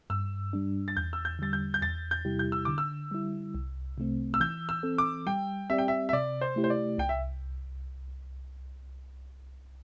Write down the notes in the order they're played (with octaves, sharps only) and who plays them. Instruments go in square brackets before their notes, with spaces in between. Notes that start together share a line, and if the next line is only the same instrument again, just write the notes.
[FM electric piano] G2 [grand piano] E6
[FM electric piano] G3 D4
[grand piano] A6
[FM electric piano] E2 [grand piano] G6
[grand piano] E6
G6
[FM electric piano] D3 G3 [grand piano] A6
[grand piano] G6
G6
[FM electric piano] E2 [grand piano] A6
[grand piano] G6
[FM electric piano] C3 G3 E4 G4
[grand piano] G6
E6
[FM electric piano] D3 [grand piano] D6
[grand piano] E6
[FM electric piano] G3 E4
C2
C3 A3 C4
[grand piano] E6
[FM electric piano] E3 [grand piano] G6
[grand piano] E6
[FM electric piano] C4 A4
[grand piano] D6
[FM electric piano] G3 [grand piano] G5
[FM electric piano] C4 G4 D5 [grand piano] E5
[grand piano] G5
E5
E5
[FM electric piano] C3 [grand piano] D5
[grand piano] C5
[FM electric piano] A3 E4 G4
[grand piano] C5
D5
[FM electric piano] C2 [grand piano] G5
[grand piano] E5